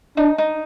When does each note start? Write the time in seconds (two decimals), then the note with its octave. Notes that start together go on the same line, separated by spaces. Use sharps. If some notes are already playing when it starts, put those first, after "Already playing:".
0.17 D4 D#4
0.38 D#4